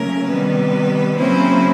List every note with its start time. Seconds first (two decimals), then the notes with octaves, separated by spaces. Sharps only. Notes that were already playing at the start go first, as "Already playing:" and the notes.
Already playing: C#3 F#3 A3 A#3 C#4 A#4
0.28 C3 D#3 G3 B3 B4
1.18 C#3 F#3 A#3 C4 C#4 E4 C5